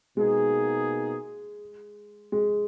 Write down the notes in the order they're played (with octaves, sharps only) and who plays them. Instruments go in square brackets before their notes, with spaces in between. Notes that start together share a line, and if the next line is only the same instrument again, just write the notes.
[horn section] B2 A#3 D#4 G#4 [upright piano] G#3
[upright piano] G#3